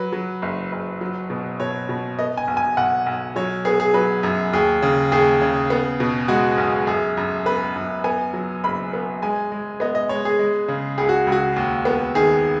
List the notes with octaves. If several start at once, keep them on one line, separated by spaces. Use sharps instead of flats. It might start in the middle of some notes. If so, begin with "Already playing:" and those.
Already playing: F#3 B4
F#3
F#1
F#1
F#3
B2
B2 C#5
B2
B3 D#5
G#5
B1
G#5
B1 F#5
B1
F#3 C#5
B3 G#4
G#4
F#3 B4
F#2
D#2 G#4
C#3
D#2 G#4
C#3
B3
B2
G#3 F#4
B1
F#2 G#4
F#2
B3 B4
F#2
B3 G#5
F#3
F#1 B5
B3
G#3 G#5
G#3
B3 D#5
D#5
G#3 C#5
G#4
G#3
C#3
C#2 G#4
F#4
C#2
F#4
D#2
B3
D#3 G#4